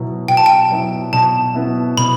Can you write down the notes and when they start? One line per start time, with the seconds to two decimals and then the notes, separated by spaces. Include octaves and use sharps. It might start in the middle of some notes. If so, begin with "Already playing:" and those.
Already playing: B2 F#3 B3 E4
0.28 B2 G5
0.37 A5
0.46 G5
0.70 F#3 B3 E4
1.13 B2 A5
1.55 F#3 B3 E4
1.97 B2 B5